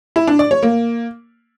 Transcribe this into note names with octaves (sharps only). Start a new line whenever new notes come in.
E4
D4
D5
C#5
A#3